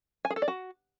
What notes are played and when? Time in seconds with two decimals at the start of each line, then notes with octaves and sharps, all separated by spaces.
0.25 G#5
0.31 G#4
0.36 A4
0.42 D5
0.48 F#4